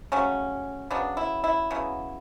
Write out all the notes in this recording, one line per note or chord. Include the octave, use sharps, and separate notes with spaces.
C#3 F#3 A3 C#4
C#3 F#3 B3 D4
E4
E4
C#3 F#3 B3